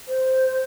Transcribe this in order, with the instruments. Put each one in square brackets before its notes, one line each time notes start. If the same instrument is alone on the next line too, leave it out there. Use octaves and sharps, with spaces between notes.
[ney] C5